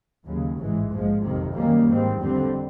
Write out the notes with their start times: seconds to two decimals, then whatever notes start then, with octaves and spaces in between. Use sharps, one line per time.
0.24 D#2 C#3 F#3
0.57 A1 G#2 E3 G#3
0.89 A#1 G#2 F3 G#3
1.20 F#1 F2 C3 D#3
1.52 F#2 D#3 G3 A#3 C#4
1.85 G#2 D#3 G3 C4
2.18 F2 D3 G3 C4